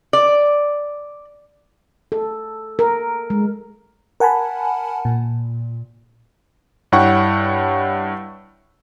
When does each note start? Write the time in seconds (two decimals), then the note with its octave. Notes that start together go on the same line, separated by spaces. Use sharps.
0.13 D5
2.12 A4
2.79 A#4
3.30 G#3
4.20 A#4 F#5 G#5 A5 B5
5.05 A#2
6.92 G2 E4 C#5 F#5 G5 C#6